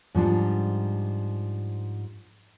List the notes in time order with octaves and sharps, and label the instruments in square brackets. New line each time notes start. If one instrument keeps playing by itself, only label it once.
[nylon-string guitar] G#2 F3 G3 D4